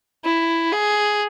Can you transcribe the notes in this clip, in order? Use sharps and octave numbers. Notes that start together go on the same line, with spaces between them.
E4
G#4